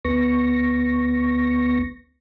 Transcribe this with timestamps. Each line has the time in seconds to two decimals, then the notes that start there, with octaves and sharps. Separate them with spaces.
0.05 D2 B3 C#6 A#6